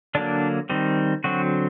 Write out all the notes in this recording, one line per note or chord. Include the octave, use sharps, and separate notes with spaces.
D3 F#3 A#3 D4
D#3 G3 C4
D3 F#3 C4 F#4